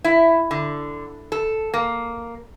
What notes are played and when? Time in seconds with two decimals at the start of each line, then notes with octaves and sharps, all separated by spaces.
0.04 E4
0.51 D3
1.32 A4
1.74 A#3